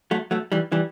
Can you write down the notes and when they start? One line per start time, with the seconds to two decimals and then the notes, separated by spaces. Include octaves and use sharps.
0.11 F#3 A3
0.31 F#3 A3
0.52 E3 G3
0.72 E3 G3